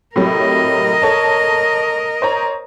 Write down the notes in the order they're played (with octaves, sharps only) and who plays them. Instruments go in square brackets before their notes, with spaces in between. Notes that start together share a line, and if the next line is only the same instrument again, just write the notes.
[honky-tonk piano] A2 C3 F#3 [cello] A#4 D#5
[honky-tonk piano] A4 C#5 A5
C5 C#5 A#5